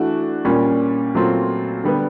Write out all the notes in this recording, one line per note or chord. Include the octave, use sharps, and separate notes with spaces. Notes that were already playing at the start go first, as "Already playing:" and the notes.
Already playing: E3 A3 D4 F#4
A#2 G3 A#3 C#4
A#2 F#3 A3 C4 F4
D3 G3 B3